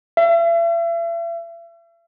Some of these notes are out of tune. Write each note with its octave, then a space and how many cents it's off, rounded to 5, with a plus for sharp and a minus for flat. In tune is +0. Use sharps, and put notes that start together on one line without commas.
E5 +40